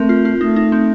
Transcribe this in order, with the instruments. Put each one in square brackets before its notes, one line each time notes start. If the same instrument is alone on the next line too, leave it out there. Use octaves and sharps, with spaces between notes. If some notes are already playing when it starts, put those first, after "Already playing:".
Already playing: [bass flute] A3 [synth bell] C4 A#4
[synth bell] F4
F4
[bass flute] A3 [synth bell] D#4
[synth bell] D#4
C4